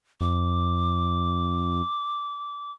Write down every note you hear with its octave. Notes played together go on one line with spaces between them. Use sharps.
F2 D6